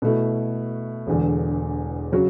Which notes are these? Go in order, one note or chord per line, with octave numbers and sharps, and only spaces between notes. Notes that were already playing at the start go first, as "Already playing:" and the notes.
B2 A3 E4
E1 E2 D3
C#3 F#3 C#4 F#4